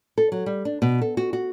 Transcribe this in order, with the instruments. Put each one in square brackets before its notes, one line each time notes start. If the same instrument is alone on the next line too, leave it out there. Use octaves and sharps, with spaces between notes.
[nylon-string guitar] A4
F#3
G3
D4
B2
A4
F#4
F#4